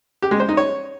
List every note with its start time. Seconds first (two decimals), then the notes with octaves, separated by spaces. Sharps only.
0.22 G4
0.31 G#3
0.40 C5
0.49 D#4
0.57 C#5